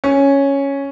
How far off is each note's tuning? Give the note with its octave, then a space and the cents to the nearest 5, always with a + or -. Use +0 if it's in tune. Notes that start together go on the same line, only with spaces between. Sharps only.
C#4 +0